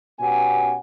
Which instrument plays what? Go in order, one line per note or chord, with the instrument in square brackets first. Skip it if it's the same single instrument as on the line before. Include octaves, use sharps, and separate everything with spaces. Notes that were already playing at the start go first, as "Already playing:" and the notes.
[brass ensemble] B2 B3 C#4 G4 F#5 G#5